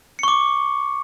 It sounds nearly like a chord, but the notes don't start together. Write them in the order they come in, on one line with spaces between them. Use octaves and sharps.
C#7 C#6 D6